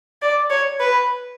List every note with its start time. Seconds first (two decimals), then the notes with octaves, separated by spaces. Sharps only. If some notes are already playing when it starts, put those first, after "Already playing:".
0.22 D5
0.50 C#5
0.80 B4